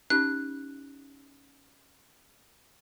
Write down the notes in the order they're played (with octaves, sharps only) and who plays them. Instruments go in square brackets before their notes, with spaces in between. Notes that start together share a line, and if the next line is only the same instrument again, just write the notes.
[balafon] C#4 D#4 G4 [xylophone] F#6